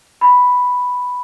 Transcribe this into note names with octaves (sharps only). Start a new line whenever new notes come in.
B5